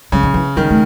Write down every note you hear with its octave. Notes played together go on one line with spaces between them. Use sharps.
C#3 G3
D#3
E3
D#3 G3
A3